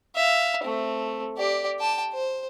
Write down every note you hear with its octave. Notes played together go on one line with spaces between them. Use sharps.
E5 F5
A3 C4
G4 D5
G5 A5
C5